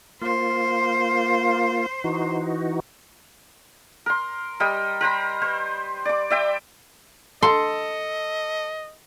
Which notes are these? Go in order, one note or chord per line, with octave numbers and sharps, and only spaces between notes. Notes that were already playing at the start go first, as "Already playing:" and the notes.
A#3 F4 C5
E3 D#4 F#4
A#4 C6
G3 A#4 D#5 G5
A#4 C5 A#5 B5
B4 C5
D5 D6
D5 E5 G5
A4 D#5 C6